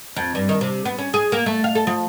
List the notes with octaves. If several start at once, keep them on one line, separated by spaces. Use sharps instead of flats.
F2
G2
D#3
C3
B3
C#4
G#4
A#3
A3
F5
A4
F3